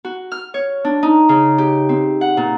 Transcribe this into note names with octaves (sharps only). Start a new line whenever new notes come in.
F#4
F6
C#5
D4
D#4
C#3
G4
C4
F#5
A#2